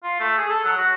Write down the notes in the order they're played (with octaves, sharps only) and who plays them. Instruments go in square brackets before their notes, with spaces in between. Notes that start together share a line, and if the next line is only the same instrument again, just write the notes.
[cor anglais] F4
A3
G#4
A4
F#3
F#4